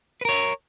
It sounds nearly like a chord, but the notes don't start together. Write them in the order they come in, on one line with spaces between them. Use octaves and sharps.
B4 A#4 C#5